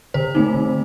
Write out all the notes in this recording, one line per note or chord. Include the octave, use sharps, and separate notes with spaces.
D3 C5
A3 C4 D#4
D3